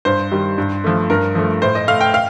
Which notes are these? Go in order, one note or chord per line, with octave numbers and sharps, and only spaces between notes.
G2 C5
D#3 G3
G2
F3 A3
G2 A#4
F3 A3
A2 C5
D#5
A3 F5
G5
F5